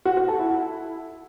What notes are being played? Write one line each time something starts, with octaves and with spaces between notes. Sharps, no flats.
F#4
F#4
A4
E4